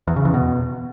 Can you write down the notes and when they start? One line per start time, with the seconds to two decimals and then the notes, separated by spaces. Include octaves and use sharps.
0.07 E2
0.16 C#3
0.25 E2
0.34 B2